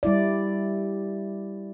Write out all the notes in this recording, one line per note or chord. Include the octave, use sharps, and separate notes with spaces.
G3 E4 D5